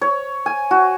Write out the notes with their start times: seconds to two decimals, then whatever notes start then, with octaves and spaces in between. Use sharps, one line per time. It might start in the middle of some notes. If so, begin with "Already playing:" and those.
0.01 C#5
0.46 G#5
0.71 F#4